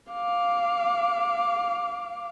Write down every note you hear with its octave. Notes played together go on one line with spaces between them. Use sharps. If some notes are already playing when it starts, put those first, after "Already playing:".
F5 D6